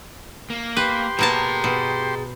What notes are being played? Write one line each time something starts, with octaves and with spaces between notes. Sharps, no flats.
A#3
G4 B4 C6
B2 A#3 G#4 A5 A#5
B2